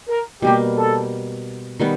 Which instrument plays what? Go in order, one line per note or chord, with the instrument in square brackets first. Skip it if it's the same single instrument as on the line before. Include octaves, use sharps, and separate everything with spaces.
[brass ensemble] A#4
[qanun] B2 G3 A#3 [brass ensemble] G4
[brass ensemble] A4
[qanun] D#3 G3 B3